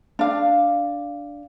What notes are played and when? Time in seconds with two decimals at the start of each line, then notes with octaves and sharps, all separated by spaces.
0.19 D4 F5